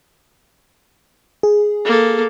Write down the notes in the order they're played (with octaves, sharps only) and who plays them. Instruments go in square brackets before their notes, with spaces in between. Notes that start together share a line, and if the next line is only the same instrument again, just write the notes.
[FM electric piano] G#4
[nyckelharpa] A#3 A4